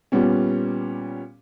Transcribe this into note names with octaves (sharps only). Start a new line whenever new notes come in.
A#2 G3 B3 C#4